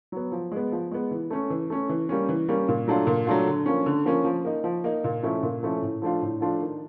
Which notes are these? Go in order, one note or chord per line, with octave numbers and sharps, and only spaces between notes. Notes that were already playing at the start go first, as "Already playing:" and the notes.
F#3 B3
F3
G#3 B3
F3
G#3 B3
E3
A3 C#4
E3
A3 C#4
E3
G3 A#3 C#4
E3
G3 A#3 C#4
A#2
F#3 A3 D4 F4
A#2
F#3 A3 D4 F4
D3
F3 A#3 C#4
D3
F3 A#3 C#4
F3
A#3 D#4
F3
A#3 D#4
A#2
F3 A3 C#4 E4
A#2
F3 A3 C#4 E4
A2
F3 A3 D4 F4
A2
F3 A3 D4 F4
D#3